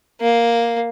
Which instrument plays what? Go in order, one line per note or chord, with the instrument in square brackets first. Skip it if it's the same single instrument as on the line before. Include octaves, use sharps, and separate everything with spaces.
[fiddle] A#3